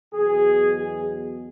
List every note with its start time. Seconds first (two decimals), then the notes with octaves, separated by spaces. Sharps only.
0.13 E2 B2 F#3 G#4
0.76 G#4